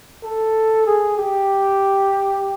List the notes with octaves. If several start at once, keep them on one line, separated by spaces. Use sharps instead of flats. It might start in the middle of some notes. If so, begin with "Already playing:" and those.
A4
G#4
G4